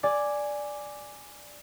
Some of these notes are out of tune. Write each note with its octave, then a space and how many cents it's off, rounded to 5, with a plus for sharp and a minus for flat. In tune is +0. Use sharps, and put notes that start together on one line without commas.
D5 +0 G#5 +0